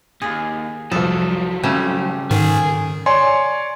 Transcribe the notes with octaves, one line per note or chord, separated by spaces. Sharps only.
D#2 G#4
C2 F2 F3 F#3 A4
C#3 G3 A3 C4
G#2 D#3 G#4 G#5
C#5 D5 G#5 C6